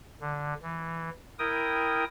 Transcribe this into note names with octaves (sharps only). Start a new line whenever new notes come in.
D3
E3
E4 A#4 G5 D#6